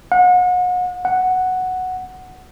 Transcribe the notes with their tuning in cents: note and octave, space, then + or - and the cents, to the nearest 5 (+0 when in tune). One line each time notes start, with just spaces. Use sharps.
F#5 -35
F#5 +0